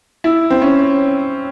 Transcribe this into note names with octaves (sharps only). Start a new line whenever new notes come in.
E4
C4
C#4